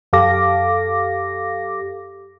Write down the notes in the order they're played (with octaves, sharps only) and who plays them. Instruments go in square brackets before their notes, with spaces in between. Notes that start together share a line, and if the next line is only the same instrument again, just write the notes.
[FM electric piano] F#2 G4 A4 F5 D6 A#6